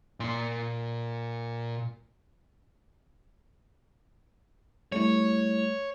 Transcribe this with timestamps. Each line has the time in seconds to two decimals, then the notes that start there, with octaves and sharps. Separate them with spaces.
0.20 A#2 C6
4.92 G3 A3 E4 C#5